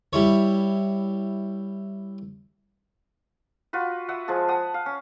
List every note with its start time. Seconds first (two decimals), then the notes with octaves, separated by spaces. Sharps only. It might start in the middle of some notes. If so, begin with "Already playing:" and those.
0.13 G3 E4 C#5
3.73 F4 F#4 B4
4.09 B4 E5 F#5
4.28 F3 G#3 G#4 A5
4.48 F#5 A5 D#6
4.74 F5
4.86 C#4